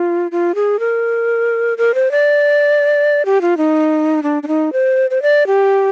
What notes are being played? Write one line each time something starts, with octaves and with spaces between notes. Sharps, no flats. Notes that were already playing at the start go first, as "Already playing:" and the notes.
Already playing: F4
F4
G#4
A#4
A#4
C5
D5
G4
F4
D#4
D4
D4
D#4
C5
C5
D5
G4